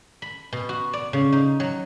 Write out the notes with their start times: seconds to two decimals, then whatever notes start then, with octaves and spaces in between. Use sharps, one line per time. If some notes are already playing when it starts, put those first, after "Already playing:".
0.22 B5
0.53 B2
0.69 F#4
0.93 D5
1.13 C#3
1.32 D#4
1.60 F#3